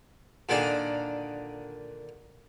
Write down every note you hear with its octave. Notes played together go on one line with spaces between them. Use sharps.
A#2 D3 D#3 D4 G#4